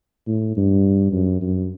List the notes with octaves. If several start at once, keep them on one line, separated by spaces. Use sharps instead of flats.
A2
G2
F#2
F#2